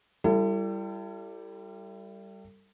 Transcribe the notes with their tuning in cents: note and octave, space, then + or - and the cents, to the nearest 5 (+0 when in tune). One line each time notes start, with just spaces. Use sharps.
G3 +0 E4 +35 A4 +35